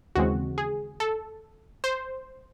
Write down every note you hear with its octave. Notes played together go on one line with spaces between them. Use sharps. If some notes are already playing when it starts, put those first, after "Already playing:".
D#2 C#3 E3 G#3 C4 F#4
G#4
A4
C5